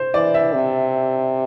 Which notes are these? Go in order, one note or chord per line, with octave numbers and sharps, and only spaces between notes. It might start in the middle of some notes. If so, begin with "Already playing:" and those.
Already playing: C5
E3 D5
E5
C3